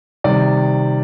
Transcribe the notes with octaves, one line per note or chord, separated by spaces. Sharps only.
C3 D#3 G3 D5